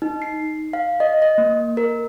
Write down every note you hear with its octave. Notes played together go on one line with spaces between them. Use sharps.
D#4
C7
F5
D#5
D#5
A#3
A#4